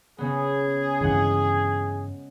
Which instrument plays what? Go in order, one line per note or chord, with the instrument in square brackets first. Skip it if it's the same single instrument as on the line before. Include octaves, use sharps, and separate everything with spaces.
[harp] C#3 B3 [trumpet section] G#4
[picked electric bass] G2 C#3 E3 [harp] G#3 F#5